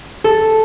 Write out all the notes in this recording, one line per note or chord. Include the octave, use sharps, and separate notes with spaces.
A4